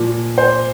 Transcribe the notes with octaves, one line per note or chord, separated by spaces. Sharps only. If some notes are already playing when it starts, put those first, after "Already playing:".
Already playing: A#2 F3
C5